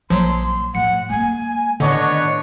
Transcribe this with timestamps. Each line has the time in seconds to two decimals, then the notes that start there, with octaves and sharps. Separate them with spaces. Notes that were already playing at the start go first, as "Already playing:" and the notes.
0.10 A#1 F3 F#3 C6
0.75 A2 F3 F#5 C#7
1.10 G#3 A#3 G#5
1.80 A2 D3 D#3 B3 D4 C#5 D#5